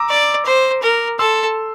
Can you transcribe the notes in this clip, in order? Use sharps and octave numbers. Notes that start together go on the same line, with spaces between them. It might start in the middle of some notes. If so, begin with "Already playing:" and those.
Already playing: A#5 D6 E6
D5
C5
A#4
A4 C6 E6